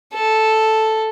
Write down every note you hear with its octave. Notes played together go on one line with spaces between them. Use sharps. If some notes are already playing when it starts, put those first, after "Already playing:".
A4